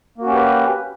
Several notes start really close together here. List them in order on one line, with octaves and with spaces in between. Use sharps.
A#3 F#4 C#4 G4 B4